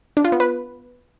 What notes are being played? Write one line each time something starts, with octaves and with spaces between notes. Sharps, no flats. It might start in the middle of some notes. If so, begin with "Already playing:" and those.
D4
F4
B3
B4